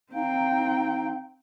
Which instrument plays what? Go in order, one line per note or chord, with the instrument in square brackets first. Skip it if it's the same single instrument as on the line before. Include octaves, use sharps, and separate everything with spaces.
[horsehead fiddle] C4 G5 [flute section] D#4 F5 A#5